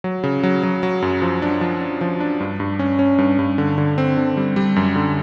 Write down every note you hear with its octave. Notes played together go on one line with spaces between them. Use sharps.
F#3
C#3
F#3
F#3
F#3
F#2
F3
D4
F3
D4
F3
D4
G2
G2
C#4
C#4
G2
G2
D3
D3
C4
D3
G3
G3
F#2
D3